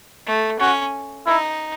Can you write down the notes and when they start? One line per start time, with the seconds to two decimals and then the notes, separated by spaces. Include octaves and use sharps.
0.26 A3
0.60 C#4 F#4
1.26 D#4 E4